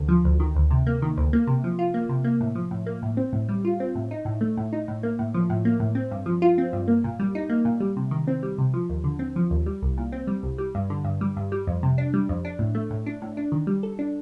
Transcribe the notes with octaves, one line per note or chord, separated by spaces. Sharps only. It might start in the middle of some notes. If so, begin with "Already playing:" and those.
Already playing: D2 D3
F3
D2
D#3
D2
C3
A#3
D#3
D2
A#3
C3
F3
F4
A#3
C3
A#3
A2
F3
A2
A#3
A2
C4
A2
G3
F4
C4
A2
D#4
A2
A3
A2
D#4
A2
A#3
A2
F3
A2
A#3
A2
C4
G2
F3
F4
C4
G2
A#3
A#2
G3
D#4
A#3
A#2
G3
C3
D#3
C4
G3
C3
F3
D#2
D3
C4
F3
D#2
G3
C2
A#2
C4
G3
C2
G3
G2
D3
G2
G3
G2
G3
F2
C3
D4
G3
F2
D4
A2
A3
A2
D4
A2
D4
D#3
G3
A4
D4